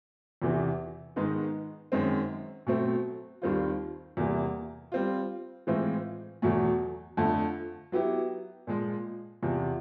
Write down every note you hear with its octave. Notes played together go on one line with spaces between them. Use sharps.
E2 C3 E3
G#2 D#3 G#3 B3 D#4
F#2 D#3 G#3 C4
B2 F#3 A3 C4
D#2 D#3 G3 C4 F4
E2 C3 E3 G3 A#3
G3 C4 F4
A2 E3 G#3 C4 F4
E2 B2 F#3 A3
F2 D3 F3 A3
F#3 B3 E4 G4
A#2 F3 G#3
E2 C3 F3